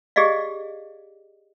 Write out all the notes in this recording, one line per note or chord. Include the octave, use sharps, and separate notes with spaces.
G4 G#4 D5 D#5 F5